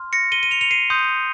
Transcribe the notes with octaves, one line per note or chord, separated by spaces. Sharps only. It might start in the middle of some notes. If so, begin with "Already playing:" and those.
Already playing: C6 F6
A#6 C#7
D#7 G7
D#7
C#7 F7
C#7 F7
C7 D#7
C6 D#6 G6